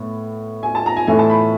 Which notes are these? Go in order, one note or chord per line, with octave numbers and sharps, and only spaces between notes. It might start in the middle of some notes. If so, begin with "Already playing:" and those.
Already playing: A2 B3
G#5
A5
A#5
G#5
A2 E3 A3 G#5
A5
B5